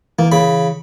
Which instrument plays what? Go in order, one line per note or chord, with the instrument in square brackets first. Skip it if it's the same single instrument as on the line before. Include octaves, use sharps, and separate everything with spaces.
[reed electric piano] E3 [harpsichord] A#3
[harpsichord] C#3 B5